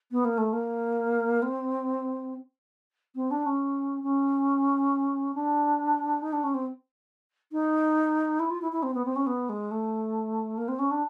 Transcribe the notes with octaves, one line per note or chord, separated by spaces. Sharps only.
B3
A#3
A3
A#3
C4
C4
D4
C#4
C#4
D4
D#4
D4
C#4
C4
D#4
E4
F4
E4
E4
C4
B3
C4
C#4
B3
G#3
A3
A#3
C4
C#4
D4